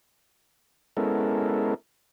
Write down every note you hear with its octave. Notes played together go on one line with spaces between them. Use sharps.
G#3 B3 C#4 E4 A4 A#4